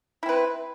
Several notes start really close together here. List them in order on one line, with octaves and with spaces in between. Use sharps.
E4 C4 B4